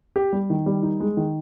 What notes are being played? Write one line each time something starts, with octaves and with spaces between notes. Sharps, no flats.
G4
G3
D#3
G3
D#4
G#3
D#3